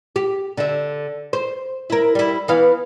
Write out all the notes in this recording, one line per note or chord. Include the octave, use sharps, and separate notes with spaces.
G4
D3 E5
C5
E4 A#4
G3 E4
E3 B3 F5